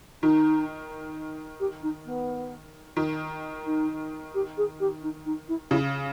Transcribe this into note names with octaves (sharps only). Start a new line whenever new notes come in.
D#3 D#4
G4
D#4
B3
D#3
D#4
G4
G#4
G4
D#4
D#4
E4
C#3 E4